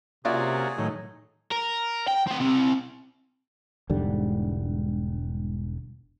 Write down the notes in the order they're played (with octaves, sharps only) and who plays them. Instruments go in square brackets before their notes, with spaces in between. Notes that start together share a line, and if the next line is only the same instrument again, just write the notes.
[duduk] C3 [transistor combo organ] A#3 C#4 F#4 [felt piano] F4 D5 E5 [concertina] G#4
[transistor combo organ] A2 D#3 [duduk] F#3
[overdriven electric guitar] A#4
G5
C4 F#5
C4 E4
[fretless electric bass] E1 G#2 D3 G3